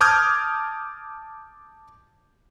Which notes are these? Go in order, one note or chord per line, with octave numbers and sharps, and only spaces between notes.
A5 D6 D#6 F6 G6 G#6